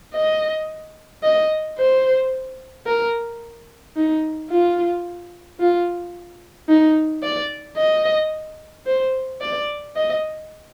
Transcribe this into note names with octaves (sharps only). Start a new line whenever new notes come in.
D#5
D#5
C5
A#4
D#4
F4
F4
D#4
D5
D#5
C5
D5
D#5